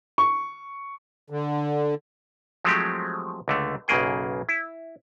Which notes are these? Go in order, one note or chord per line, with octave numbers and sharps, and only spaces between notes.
C#6
D3
F3 F#3 G#3 A3 C4 G4
C#2 D3 A3
B1 F#2 C#3 A#3 G#4 G5
E4